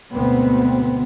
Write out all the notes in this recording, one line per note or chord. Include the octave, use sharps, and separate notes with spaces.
D2 G#2 B2 B3 C4